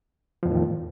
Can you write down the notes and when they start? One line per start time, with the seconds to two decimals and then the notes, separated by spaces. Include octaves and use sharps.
0.43 F3
0.45 E2
0.48 A2
0.51 D#3